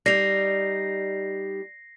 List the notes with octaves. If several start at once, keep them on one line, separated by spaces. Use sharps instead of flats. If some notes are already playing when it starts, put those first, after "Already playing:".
G3 D#4 D5 A#6 C7 F7